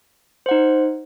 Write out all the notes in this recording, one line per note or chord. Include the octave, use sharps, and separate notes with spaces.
D#4 C5 F#5